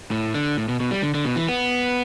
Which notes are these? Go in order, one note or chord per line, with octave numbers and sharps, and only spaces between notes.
A2
D3
A2
B2
B2
G3
D3
D3
B2
E3
B3